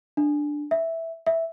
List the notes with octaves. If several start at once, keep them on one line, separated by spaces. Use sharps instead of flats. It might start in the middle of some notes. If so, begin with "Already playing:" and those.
D4
E5
E5